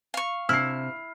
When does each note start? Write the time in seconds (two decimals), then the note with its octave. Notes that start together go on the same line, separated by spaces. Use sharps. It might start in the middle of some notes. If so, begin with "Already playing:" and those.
0.14 F5 C#6
0.49 C3 D4 E4 F6 C7